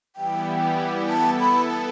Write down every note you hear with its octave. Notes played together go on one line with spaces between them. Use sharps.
E3 G3 B3 E4 G4 G5
B3 E4 A4 A5
B5
A5